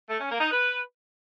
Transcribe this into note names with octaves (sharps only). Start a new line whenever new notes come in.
A3
C#4
A#3
D#4
B4